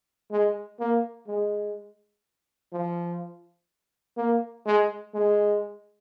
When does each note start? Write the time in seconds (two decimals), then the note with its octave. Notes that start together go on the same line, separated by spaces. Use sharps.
0.31 G#3
0.80 A#3
1.28 G#3
2.73 F3
4.17 A#3
4.66 G#3
5.14 G#3